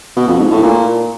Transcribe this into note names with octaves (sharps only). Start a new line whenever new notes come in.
B2
F2
G#2
A2
A#2